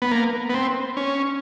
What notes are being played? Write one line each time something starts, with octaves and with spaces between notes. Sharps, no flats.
B3
A#3
B3
C4
C#4